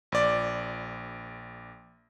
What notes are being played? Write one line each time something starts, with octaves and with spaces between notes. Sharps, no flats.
A#1 D5